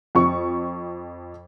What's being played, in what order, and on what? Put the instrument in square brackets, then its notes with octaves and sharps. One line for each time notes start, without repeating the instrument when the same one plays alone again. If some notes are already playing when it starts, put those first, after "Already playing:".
[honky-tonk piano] F2 C#6